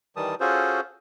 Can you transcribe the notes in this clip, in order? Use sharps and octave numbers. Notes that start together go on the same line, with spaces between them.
D#3 E3 G3 A5 D#6
C#4 F4 F#4 G#4 A4 C5